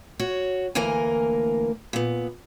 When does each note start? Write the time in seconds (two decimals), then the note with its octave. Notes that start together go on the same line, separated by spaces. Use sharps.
0.19 F#4 C#5
0.75 D2 E3 A#3 A#4 G#5
1.93 A#2 B3